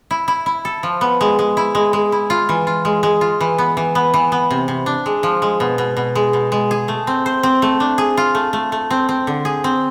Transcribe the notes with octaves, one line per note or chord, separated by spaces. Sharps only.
E4
E4
E4
A4
F3
B3
G#3
G#3
E4
G#3
G#3
E4
F4
E3
F4
G#3
G#3
F4
E3
B3
E3
B3
E3
B3
C3
C3
D4
G#3
F3
G#3
B2
B2
B2
G#3
B2
G#3
G#4
A3
C4
C5
C4
A3
D4
G#4
F4
A3
A3
A3
C4
C4
D3
G#4
C4